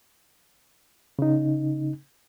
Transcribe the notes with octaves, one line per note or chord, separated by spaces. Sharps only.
C#3 D#4